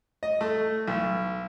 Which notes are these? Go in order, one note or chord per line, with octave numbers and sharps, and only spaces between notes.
D#5
A3
B1